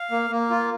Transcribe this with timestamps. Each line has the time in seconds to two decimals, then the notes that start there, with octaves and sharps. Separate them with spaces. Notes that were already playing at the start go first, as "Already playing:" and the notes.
Already playing: F5
0.11 A#3
0.30 A#3
0.50 F4